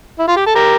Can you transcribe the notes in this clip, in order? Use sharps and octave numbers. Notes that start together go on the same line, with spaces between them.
E4
F4
G4
A4
G4 A#4